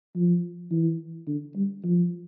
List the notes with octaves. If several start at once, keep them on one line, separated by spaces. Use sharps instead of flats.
F3
E3
D3
G3
F3